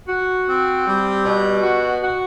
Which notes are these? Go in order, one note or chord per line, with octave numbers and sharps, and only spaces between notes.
F#4
C4
G3
B2
F#4
F#4